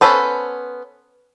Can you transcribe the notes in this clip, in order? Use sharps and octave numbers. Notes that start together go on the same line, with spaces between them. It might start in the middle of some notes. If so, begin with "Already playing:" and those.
B3 C#4 A4 B4 C5